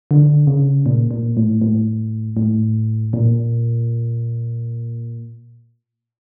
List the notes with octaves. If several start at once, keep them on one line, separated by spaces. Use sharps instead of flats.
D3
C#3
A#2
A#2
A2
A2
A2
A#2